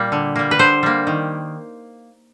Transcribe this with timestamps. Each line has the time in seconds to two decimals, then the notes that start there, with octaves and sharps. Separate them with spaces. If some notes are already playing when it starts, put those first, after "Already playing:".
Already playing: A#2 G3 A#3
0.12 D3
0.36 G3 A#3
0.51 B4
0.59 D3 C5
0.83 G3 A#3
1.07 D#3